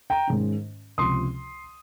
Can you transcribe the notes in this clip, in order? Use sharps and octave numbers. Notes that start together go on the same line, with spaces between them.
G5 A#5
G#2 D#3 G#3 C#4
C#2 C3 F3 C6 D#6